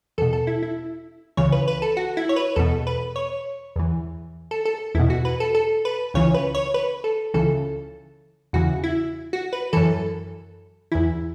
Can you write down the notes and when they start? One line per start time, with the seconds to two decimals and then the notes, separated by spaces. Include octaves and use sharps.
0.18 E2 B2 A4
0.33 A4
0.47 E4
0.63 E4
1.37 C#2 C#3 E3 C#5
1.52 B4
1.68 B4
1.82 A4
1.97 F#4
2.17 E4
2.29 C#5
2.36 B4
2.56 E2 B2 A4
2.87 B4
3.16 C#5
3.76 E2 E3
4.51 A4
4.65 A4
4.95 E2 B2 E4
5.10 F#4
5.25 B4
5.40 A4
5.55 A4
5.85 B4
6.14 C#2 C#3 E3 C#5
6.34 B4
6.55 C#5
6.74 B4
7.04 A4
7.34 C#2 C#3 E3 A4
8.53 E2 C#3 E3 F#4
8.84 E4
9.33 F#4
9.53 B4
9.73 F#2 E3 A4
10.92 E2 E3 E4